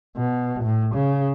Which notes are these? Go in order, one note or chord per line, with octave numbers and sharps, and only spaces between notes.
B2
A2
C#3